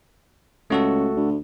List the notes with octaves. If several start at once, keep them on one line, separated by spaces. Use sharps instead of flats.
C#2 A3 F#4 A4
D2